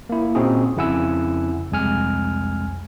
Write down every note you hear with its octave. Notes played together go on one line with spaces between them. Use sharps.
A#3 E4
A#2 C4 C#4 D#4 F#4 G#4
F2 C#3 E4 F#5 G#5 E6
C2 F2 G#3 G#5 F6